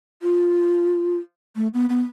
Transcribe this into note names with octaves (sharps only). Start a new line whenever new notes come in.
F4
A3
B3
B3